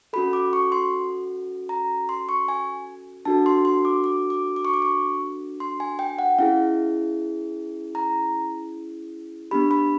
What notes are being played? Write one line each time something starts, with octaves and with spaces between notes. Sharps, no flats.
C#4 F#4 A4 B5
D6
C#6
C6
A#5
C6
C#6
G#5
D4 F#4 A4 A5
C6
C6
D6
D6
D6
D6
C#6
D6
C#6
C6
G#5
G5
F#5
C#4 E4 G#4 F5
A#5
B3 D4 G4 B5
B5